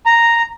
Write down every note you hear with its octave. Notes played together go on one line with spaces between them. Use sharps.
A#5